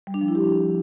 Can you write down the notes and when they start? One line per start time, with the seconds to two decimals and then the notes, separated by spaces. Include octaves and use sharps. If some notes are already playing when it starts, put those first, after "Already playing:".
0.07 G3
0.14 D4
0.21 F3
0.28 E4
0.35 G4